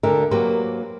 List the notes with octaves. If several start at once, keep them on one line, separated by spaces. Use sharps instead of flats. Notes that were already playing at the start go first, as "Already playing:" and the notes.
D2 D3 A#4 E5
F#3 A#3 G4 B4 C5